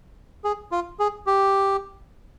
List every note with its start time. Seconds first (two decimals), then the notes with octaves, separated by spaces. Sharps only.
0.44 G#4
0.72 F4
0.99 G#4
1.27 G4